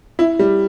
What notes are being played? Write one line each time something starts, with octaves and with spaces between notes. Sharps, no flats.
E4
G3